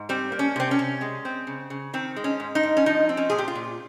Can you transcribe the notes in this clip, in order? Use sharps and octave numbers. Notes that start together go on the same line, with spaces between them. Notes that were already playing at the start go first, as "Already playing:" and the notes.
Already playing: G#2
G3 C4
A#3
C#4
C3 C4
C#4
C3
G#3
C4
C#3
C#3
D#3 C4
G#3
C#4
G#2
D#4
G#2
C#4
F3 D#4
C4
C#4
A#2 G#4
G4
F4
A#2